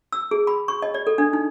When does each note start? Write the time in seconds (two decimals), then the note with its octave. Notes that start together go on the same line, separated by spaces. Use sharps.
0.13 E6
0.31 G#4
0.47 B5
0.68 C#6
0.82 D#5
0.94 D5
1.07 A4
1.18 D4
1.33 D#4